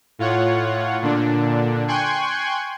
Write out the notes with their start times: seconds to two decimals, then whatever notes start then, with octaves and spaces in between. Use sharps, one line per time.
0.19 A2 F4 C#5 F#5
1.02 A#2 D3 D4
1.88 G5 G#5 C6 C#6 F#6 G#6